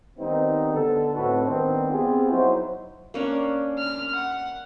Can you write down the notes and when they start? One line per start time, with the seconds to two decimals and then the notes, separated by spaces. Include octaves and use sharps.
0.18 D#3 G3 B3 C4 D#4
0.74 D3 B3 A4
1.15 A2 C4 D#4 F#4 A4 B4
1.45 D#3 G3 B3 C4 D4 D#4
1.91 B3 C4 F4 G4 G#4
2.31 F#3 D#4 E4 F#4 C5
3.14 A#3 C#4 D4
3.79 F6
4.15 F#5